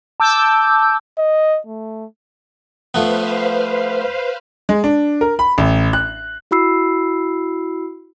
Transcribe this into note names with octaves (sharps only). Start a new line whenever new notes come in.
A5 D6 E6 G6
D#5
A3
F3 A3 B3 B4 C5 F5
G#3
D4
A#4
B5
A1
F#6
E4 F#4 B5 E6 C7